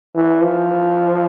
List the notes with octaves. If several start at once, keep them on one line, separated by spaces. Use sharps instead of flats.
E3
F3